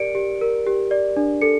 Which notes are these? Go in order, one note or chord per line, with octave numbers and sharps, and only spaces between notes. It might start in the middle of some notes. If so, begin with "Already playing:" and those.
Already playing: G4 A#4 D5 C#7 D7
G4
A#4
G4
D5
D4
A4 C#7